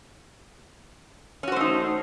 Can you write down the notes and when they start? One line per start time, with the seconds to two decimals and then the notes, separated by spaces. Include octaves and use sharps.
1.43 C#4
1.48 F#4
1.52 C5
1.56 A3
1.61 D#4